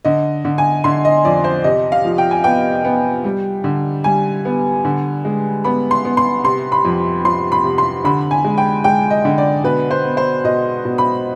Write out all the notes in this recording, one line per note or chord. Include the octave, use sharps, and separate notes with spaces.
D3 D#5
D3
G#5
D3 C6
D#5
F2 D5
C5
C3 D#5
F5
F3
G5
G#5
B3 G5
B3
G3
D3
G3 G#5
B3
D3
G#3
B3 B5
C6
B3
C6
C3 C6
B5
F2
F2 C6
B5
C3
C6
D3 B5
G#5
G#3
G5
G#3 G5
D#5
D3
D5
B2 B4
C5
B3
C5
B2 D#5
B2
B5